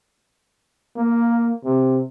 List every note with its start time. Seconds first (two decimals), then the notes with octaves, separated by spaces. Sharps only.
0.96 A#3
1.64 C3